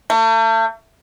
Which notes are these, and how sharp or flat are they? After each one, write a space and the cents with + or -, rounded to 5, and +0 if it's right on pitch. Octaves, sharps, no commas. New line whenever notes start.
A3 +40